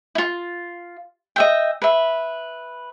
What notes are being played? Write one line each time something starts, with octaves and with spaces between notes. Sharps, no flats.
E4 F4
D#5 E5 G5
B4 E5